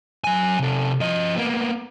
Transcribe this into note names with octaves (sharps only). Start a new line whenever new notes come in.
F#3 G#5
C3 A4
F3 D#5
A#3 B3